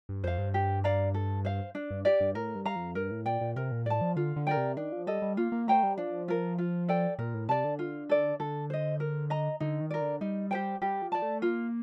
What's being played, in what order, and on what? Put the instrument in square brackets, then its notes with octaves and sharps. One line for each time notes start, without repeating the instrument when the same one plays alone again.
[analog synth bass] G2
[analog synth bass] F2 [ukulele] C5 F5
[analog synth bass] G2
[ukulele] G4
D5 F5 A#5
A4
C5 F5
D4
[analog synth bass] G2
[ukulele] G4 D5
[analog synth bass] G2
[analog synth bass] A2 [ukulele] A#4
[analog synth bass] G2
[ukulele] F5 A#5
[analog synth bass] F2
[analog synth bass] G2 [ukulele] A#4
[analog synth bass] A2
[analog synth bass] A#2 [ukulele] D5 G5
[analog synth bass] A#2
[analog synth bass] C3 [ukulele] A#4
[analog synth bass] A#2
[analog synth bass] A2 [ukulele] D5 A5
[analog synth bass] F3
[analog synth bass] D3 [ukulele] F4
[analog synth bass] D3
[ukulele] A#4 D5 G5
[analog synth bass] C3
[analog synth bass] D#3 [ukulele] D4
[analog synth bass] F3
[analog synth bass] G3 [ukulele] A4 D#5
[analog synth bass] G3
[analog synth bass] A#3 [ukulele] F4
[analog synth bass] A#3
[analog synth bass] A3 [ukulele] C5 G5 A#5
[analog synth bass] G3
[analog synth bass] F3 [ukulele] D4
[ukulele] F4 A#4
F4
A4 D5 G5
[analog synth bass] A#2 [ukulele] A#4
[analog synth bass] A2
[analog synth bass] C3 [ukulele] D5 A5
[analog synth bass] D3
[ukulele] F4
A4 D5
[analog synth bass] D3 [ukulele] A4
[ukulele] C5 D#5
A#4
D#5 A#5
[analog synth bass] D3 [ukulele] D#4
[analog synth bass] D#3
[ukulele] A#4 D5
[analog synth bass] D3
[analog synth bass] G3 [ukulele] D#4
[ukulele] G4 C5 G5
[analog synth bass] G3 [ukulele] G4
[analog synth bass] F3
[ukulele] D5 A5
[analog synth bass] A3
[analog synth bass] A#3 [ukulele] F4